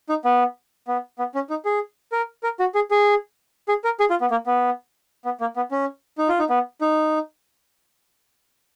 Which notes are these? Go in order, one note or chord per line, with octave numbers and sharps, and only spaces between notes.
D#4
B3
B3
B3
C#4
D#4
G#4
A#4
A#4
F#4
G#4
G#4
G#4
A#4
G#4
F4
B3
A#3
B3
B3
A#3
B3
C#4
D#4
F4
D#4
B3
D#4